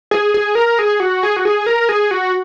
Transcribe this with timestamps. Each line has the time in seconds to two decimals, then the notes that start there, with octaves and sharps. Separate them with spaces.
0.11 G#4
0.34 G#4
0.55 A#4
0.79 G#4
1.00 F#4
1.23 G#4
1.36 F#4
1.45 G#4
1.66 A#4
1.89 G#4
2.11 F#4